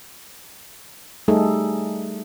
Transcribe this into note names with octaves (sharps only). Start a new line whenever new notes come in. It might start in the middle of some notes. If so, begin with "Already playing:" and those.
G3 A3 D#4 G#4 A4